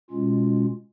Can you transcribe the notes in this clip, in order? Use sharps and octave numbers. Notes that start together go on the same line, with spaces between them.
B2 G#3 C#4 F4